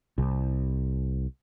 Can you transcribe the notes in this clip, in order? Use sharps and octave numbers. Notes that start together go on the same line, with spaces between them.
C2